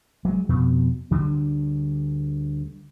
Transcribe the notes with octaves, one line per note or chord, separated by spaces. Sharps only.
F#3 G#3
F2 B2
D2 D3 G3